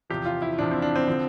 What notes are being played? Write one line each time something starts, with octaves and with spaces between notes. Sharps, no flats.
E2 C3 F3 G4
F4
E4
E2 C3 F3 D4
C4
D4
C4
D3 F3